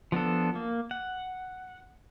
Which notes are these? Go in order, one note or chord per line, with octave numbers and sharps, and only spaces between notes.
F3 B3 D4 A4
A#3
F#5